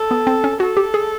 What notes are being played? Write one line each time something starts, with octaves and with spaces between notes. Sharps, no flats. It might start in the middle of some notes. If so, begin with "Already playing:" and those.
Already playing: A4
B3
C4
C#4
F#4 A4
G4
G#4